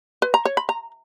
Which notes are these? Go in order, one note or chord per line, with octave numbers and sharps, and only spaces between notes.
B4
A#5
C#5
B5
A#5